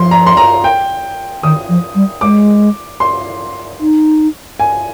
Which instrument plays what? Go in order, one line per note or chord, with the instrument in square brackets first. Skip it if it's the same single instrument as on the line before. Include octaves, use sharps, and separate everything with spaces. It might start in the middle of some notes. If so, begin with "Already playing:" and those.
Already playing: [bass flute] F3 [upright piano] C6
[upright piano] A#5
C6
A#5
G5
[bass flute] D#3 [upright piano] D#6
[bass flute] F3
G3
[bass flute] G#3 [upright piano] D6
[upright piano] C6
[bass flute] D#4
[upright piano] G#5